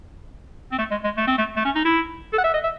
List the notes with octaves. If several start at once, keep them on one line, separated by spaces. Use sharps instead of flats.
C4
A3
G#3
G#3
A3
C4
A3
A3
C#4
D#4
E4
A4
F#5
E5
D#5
E5